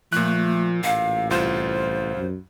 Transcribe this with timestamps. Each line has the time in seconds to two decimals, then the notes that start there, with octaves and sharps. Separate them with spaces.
0.13 A#2 F3 A3 F#6
0.83 A1 F5
1.30 C2 F4 C5
2.17 F#2